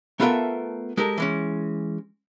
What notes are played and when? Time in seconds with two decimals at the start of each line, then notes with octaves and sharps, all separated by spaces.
0.20 A3 B3 F4 A4 A#4 E5
0.97 G#3 G4 A4 A#4
1.17 E3 G#3 C#4